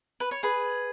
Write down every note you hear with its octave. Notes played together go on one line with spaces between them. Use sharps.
B4
C#5
G#4 B4